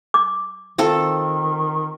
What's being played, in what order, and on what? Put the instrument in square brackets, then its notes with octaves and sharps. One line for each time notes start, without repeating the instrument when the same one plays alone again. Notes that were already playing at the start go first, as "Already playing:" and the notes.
[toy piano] D6
[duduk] D#3 [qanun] C4 F4 A4